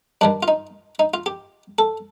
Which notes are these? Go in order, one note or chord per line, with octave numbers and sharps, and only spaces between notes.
G2 D#3 G3 D4
F4
D#4
D#4
F4
G4
A4